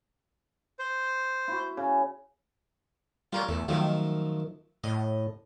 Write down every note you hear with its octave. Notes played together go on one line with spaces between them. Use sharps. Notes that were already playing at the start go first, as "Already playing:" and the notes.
C5
E4 F#4
C#3
G3 F4 A#4 C#5
E2 A3
F#2 D#3 F3 A3
A2 D#5